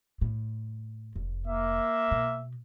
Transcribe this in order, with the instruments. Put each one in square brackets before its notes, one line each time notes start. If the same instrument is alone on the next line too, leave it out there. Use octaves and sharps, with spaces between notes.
[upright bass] A2
F1
[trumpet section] A#3 E5
[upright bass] B2